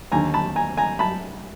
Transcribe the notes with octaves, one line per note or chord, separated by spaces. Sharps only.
D#2 D3 G#5 A#5
A5 B5
G#5 A#5
G#5 A#5
A5 B5